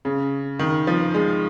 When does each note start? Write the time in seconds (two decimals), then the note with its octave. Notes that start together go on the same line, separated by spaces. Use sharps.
0.05 C#3
0.59 D#3
0.87 F3
1.14 G#3